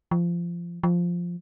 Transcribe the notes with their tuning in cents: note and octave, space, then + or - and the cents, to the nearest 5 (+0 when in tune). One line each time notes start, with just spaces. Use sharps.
F3 -20
F3 +0